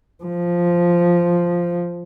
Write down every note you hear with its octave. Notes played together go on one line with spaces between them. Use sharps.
F3